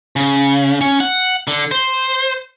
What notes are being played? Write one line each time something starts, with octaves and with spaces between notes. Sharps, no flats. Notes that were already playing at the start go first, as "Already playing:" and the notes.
C#3
C#4
F#5
D3
C5